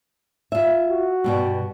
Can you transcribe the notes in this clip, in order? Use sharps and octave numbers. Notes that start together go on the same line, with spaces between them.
F4 E5
F#4
G2 B2 G3